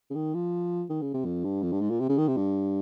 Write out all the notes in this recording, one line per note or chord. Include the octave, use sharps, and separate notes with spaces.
C#3
D#3
F3
D#3
C#3
C3
F2
G2
F2
G2
G#2
A#2
C3
C#3
D#3
C3
G2